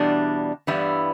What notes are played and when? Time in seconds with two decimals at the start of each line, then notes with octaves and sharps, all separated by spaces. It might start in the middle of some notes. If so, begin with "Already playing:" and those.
Already playing: E2 B2 G3 D4
0.67 G2 E3 G3 B3 E4